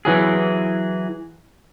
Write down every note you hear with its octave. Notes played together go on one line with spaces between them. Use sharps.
E3 F#3 G#4